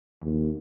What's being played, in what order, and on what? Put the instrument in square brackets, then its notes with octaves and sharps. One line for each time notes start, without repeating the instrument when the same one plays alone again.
[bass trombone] D#2